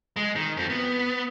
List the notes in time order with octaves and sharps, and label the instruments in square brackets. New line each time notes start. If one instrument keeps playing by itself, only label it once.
[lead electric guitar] G#3
D#3
F2 F3
B3